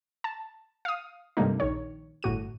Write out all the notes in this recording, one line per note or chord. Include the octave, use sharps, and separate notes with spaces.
A5
F5 D#6
G2 C3 G3 A3 A#3 D#4
A#1 D#3 C#5
G1 A2 F#4 D#7